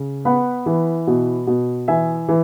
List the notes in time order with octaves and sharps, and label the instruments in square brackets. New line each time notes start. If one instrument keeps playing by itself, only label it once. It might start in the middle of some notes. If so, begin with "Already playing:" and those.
Already playing: [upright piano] C#3
B3 F#5 B5
E3
B2
B2
E3 E5 G#5
E3